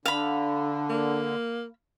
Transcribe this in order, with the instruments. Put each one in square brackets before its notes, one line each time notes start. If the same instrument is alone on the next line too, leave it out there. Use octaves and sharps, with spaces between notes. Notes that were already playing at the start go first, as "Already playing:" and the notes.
[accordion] D3 [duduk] D4 [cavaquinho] F5 B5
[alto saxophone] A#3